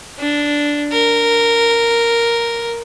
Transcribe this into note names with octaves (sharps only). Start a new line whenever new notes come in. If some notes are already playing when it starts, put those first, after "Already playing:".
D4
A#4